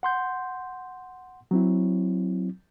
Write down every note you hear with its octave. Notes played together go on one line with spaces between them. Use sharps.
F#5 C6 G6
F#3 C4 E4